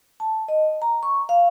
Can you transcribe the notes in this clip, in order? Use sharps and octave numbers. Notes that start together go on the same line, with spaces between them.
A5
D#5
A#5
C#6
F5